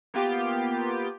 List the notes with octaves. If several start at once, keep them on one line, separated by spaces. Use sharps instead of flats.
A#3 B3 F4 G4